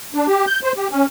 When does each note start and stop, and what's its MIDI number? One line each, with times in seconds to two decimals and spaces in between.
0.15 0.27 62
0.28 0.45 67
0.47 0.60 91
0.64 0.72 72
0.77 0.88 67
0.91 1.06 61